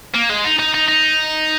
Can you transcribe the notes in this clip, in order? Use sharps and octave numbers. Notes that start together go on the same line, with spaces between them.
A#3
G#3
D#4
D#4
D#4
D#4